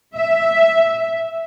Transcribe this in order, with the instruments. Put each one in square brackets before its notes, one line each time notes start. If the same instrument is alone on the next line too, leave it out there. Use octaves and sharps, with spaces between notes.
[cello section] E5